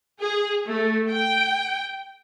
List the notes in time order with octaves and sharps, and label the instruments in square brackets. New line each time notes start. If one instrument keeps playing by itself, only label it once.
[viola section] G#4
A3
G5